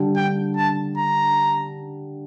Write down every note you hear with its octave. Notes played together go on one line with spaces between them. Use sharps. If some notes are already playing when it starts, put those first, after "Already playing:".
Already playing: D3 G3 D4 G4
G5
A5
A#5